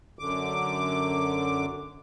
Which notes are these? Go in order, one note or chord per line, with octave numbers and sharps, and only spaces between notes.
F#2 D3 D6